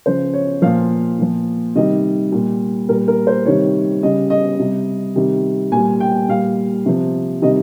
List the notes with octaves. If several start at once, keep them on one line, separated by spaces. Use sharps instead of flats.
C#3 F3 C5
C#5
A#2 F3 F5
A#2 F3
C3 D#3 G3 D#5
A#2 G3
A#2 G3 A#4
A#4
C5
C3 D#3 G3 C#5
C#3 G3 D#5
D#5
C3 G3
C3 D#3 G3
A#2 G3 G#5
G5
A#2 G3 F5
C3 F3
C3 D#3 G3 D#5